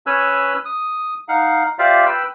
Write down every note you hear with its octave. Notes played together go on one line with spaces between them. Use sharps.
C#4 B4 C#5 G#5 E6 F#6
D#6
D#4 F5 F#5
F4 G4 C5 D5 E5 F5
B4 G5 E6 F#6